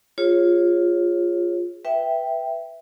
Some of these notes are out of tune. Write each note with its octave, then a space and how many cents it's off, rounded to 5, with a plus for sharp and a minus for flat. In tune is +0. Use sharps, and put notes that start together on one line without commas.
F4 +5 G#4 -15 C#5 -15
B4 +0 E5 +0 G5 +0